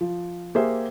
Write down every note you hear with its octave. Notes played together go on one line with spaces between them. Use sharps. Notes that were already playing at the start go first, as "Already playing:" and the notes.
F3
A#3 G4 G#4 C5 E5